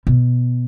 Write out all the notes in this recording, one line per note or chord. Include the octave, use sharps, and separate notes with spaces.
B2